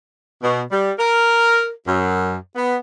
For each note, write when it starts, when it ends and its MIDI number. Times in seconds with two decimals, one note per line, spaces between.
0.43 0.61 47
0.71 0.93 55
0.99 1.70 70
1.87 2.35 42
2.55 2.77 59